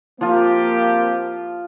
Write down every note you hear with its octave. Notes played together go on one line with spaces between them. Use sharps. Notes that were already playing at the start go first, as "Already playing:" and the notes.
F3 A#3 C4 F4 G4